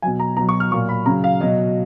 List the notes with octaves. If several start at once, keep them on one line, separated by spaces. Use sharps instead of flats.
B2 F#3 G#5
A#5
B2 F#3 A#5
C#6
F6
A#2 F#3 C#6
B5
C#3 F#3 A#5
F5
B2 F#3 D#5